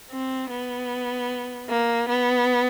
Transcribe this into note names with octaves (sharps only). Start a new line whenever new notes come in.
C4
B3
A#3
B3